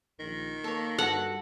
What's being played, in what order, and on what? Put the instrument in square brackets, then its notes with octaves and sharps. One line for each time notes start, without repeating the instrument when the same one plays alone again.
[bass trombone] A#1 [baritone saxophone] D#3
[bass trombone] A#3 [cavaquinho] A4 C#5
[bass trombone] G2 [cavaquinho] F#4 A4 [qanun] F#5